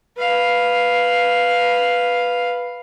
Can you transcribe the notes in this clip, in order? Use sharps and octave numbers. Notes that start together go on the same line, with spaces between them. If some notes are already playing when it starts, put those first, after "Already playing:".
B4 F5